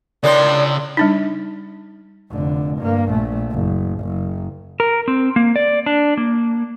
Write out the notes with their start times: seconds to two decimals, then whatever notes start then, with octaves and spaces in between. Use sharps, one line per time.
0.23 A2 C#3 D4 A#4 D5 C6
0.97 G3 D4 D#4
2.31 F1 D3
2.78 G2 A#3
3.10 A#1 A3
3.52 F#1
4.00 F#1
4.80 A#4
5.08 C4
5.36 A#3
5.56 D5
5.86 D4
6.17 A#3